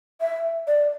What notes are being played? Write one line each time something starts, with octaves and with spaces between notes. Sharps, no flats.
E5
D5